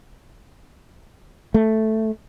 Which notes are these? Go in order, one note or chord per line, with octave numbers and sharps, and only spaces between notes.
A3